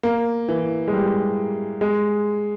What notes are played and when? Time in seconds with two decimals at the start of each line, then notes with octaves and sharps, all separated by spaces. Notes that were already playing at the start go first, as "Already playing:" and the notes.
0.03 A#3
0.49 E3
0.88 G#3
0.93 G3
1.81 G#3